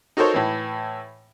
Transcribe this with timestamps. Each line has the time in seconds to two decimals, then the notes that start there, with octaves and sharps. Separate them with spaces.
0.17 D#4 F#4 A4 A#4 C5 C#5
0.34 A2 E3